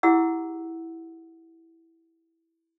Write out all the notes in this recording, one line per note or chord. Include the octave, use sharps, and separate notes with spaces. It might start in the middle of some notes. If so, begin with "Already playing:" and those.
E4 G4 G#4 F#5 E6